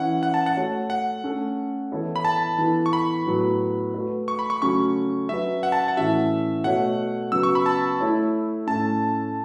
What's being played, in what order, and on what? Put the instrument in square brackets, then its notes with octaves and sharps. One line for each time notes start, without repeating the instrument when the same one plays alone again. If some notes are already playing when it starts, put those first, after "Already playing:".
Already playing: [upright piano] E3 C#4 E4 [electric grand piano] F#5
[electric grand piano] F#5
A5
F#5
[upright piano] A3 F#4 C#5
[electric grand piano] F#5
[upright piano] A3 C#4 A4
E3 B3 E4 A4 C#5
[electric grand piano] B5
A5
[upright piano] E3 B3 A4
[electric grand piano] C#6
B5
[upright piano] A2 F#3 B3
A3 F#4 B4
[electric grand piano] C#6
B5
C#6
[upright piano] C#3 F#3 A3 C#4 [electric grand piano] C#6
[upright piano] F#3 C#4 F#4 B4 [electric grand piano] E5
[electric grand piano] F#5
A5
F#5
[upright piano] A2 E3 C#4 F#4 [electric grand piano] E5
[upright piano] B2 A3 F#4 C#5 [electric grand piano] F#5
[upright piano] C#3 F#3 B3 F#4 [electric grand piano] E6
[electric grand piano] C#6
B5
A5
[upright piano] A3 E4 C#5
[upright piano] A2 A3 C#4 [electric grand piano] A5